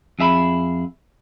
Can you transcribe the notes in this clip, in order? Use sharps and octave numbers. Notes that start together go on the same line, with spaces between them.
F2 G#4 E5 A#5 B5